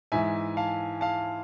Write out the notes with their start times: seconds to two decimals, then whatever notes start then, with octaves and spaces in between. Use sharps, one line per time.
0.12 G#2 E3 E5 G#5
0.57 F5 A5
1.01 F5 A5